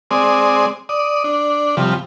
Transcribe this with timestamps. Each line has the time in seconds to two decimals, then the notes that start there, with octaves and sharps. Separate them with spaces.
0.11 G#3 C4 D5 D#6
0.89 D5 D#6
1.24 D4
1.77 C3 F3 G3